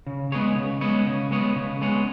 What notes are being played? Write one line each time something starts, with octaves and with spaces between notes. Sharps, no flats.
C#3
G#3 B3 G#4 C#5
C#3
G#3 B3 G#4 C#5
C#3
G#3 B3 G#4 C#5
C#3
G#3 B3 G#4 C#5